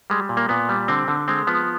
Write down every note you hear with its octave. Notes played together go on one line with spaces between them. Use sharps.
G3 G#3
A#2
A#3
A#2 B3
G3
D3 C4
D3
G#3 C4
F3 B3